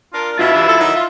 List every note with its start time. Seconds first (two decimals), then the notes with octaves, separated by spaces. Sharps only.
0.13 D4 F4 A#4
0.39 B2 E4 F4 E5
0.54 G2 E3
0.67 F3 A4
0.79 D#3 F#3 D#4
0.96 F4